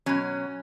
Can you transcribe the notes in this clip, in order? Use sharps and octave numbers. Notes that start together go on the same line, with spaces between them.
B2 F#3 C#4